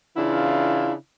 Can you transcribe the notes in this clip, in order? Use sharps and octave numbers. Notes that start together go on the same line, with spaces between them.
C#3 E3 D4 E4 F4 F5